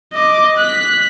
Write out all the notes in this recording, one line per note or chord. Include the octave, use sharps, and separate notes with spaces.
D#5 D6
F#6 B6